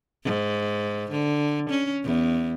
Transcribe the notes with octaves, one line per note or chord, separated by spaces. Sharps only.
G#2
D3
C#4
E2